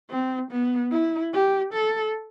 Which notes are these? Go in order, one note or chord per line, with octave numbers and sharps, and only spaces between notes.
C4
B3
E4
G4
A4